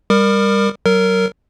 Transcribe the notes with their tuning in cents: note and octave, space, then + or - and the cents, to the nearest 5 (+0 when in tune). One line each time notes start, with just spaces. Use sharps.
G3 +20 A#4 +0 D6 +45
F#3 +30 A#4 -15